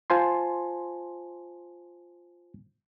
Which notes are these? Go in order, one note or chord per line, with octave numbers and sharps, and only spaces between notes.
F4 C5 G#5 A5 C6